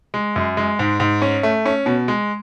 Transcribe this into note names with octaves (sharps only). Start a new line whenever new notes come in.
G#3
F#2
G#3
G#2
G#2
C#4
A3
C#4
B2
G#3